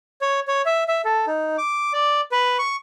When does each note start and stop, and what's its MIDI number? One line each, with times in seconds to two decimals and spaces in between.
0.21 0.40 73
0.48 0.62 73
0.66 0.84 76
0.88 1.01 76
1.05 1.26 69
1.27 1.56 63
1.58 1.93 86
1.93 2.21 74
2.32 2.58 71
2.59 2.76 85